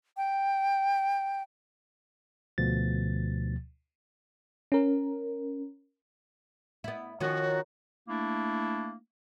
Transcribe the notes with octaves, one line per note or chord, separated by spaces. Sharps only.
G5
D2 B2 F3 A6
C#4 A#4
B3 E4
D#3 F3 C#4 F#4 C#5
A3 A#3 D4 E4